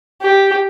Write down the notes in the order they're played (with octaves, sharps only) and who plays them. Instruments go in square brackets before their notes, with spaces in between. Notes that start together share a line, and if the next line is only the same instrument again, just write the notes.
[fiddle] G4